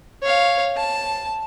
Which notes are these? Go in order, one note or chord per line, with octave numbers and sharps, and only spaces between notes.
C#5 F5
A5